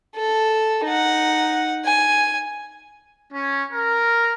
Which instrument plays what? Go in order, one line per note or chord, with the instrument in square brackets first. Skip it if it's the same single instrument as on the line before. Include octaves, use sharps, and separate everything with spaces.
[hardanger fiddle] A4
D#4 F#5
G#5
[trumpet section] C#4
A#4